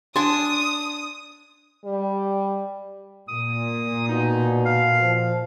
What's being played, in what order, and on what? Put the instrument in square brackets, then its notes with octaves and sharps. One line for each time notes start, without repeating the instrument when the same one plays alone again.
[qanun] D4 G#5 A5 [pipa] C6 [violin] D#6
[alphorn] G3
[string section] A#2 [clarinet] D#6
[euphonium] B2 [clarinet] D#4
[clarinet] F5
[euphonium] F3